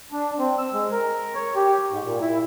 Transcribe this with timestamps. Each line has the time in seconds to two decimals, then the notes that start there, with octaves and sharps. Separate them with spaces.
0.12 D4
0.39 C4
0.58 E6
0.73 G#3
0.92 A#4
1.35 C#5
1.56 G4
1.91 G#2
2.04 A#2
2.21 E4